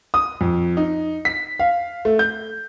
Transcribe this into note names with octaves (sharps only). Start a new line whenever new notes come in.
D#6
F2
D#4
B6
F5
A3
G6